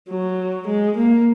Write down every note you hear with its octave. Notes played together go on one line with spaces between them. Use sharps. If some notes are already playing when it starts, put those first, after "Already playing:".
F#3
G#3
A#3